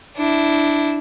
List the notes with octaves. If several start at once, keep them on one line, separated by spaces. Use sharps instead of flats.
D4 E4